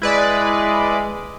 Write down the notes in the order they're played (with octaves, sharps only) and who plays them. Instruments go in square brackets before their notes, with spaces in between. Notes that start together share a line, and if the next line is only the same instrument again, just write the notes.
[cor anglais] G#3 [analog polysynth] E4 B4 D5